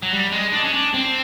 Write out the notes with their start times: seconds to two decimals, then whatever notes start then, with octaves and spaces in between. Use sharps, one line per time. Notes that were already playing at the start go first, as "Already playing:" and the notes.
0.02 F#3
0.13 G3
0.32 G#3
0.53 D4
0.64 C#4
0.74 D4
0.94 C4